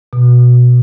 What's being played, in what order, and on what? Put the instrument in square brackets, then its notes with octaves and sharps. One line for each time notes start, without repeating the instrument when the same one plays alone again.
[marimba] B2